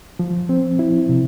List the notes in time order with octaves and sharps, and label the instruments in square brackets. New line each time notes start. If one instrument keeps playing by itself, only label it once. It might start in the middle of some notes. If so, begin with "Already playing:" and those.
[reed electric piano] F3
C4
E4
C3